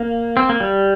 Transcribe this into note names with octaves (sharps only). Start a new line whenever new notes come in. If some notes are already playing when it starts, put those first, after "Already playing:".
Already playing: A#3
C4
A#3
G3